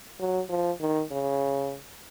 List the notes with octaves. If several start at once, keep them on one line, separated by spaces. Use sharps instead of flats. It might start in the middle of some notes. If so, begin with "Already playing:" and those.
F#3
F3
D#3
C#3